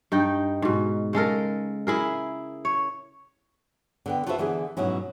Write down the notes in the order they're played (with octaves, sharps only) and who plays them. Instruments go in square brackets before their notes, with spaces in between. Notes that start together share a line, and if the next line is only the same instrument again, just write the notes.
[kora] G2 D#4 G5
G#2 B2
C#3 G#3 A4 A#4
E4 G#4 A#4
C#5
[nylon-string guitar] D3 B3 G5
F4 F#4 A4 B4 C5 E5
D3 E3 B3 G#4
G#2 B2 F#3 C#4 E4